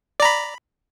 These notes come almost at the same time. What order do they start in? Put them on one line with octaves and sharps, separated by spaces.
D5 A#5 B5